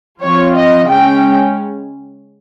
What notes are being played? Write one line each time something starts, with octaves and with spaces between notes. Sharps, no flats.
F3 C4 F4 C#5
D#5
C#3 G#3 C#4 G5